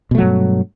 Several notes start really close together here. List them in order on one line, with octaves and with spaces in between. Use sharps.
B2 A3 F#3 G2